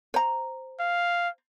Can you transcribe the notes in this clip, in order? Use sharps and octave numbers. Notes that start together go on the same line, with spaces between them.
C5 A#5
F5